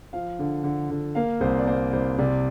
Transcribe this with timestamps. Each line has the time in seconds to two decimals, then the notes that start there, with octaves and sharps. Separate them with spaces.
0.13 F3 F5
0.39 D3
0.64 D3
0.90 D3
1.15 A#3 F5
1.41 C2 C5
1.59 D5
1.67 A#3 C5
1.93 C2 C5
2.18 C3 D5